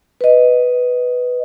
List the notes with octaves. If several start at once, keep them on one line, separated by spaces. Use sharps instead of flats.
B4 D#5